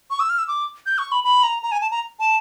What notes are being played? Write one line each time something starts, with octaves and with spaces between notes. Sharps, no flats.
C#6
E6
F6
E6
D6
G6
C#6
B5
B5
A#5
A#5
G#5
A5
A#5
A5